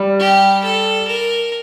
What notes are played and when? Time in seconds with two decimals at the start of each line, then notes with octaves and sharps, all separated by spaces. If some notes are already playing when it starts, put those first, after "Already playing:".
Already playing: G3
0.20 G4
0.63 A4
1.07 A#4